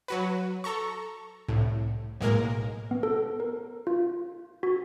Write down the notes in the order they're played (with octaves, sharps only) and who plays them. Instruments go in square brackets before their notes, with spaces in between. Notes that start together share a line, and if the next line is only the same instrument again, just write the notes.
[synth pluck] F#3 F#4 B4
A4 A#5 C#6
C2 A2
B1 A2 G#3 A#3 A#4
[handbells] B3
A4
A#4
F4
F#4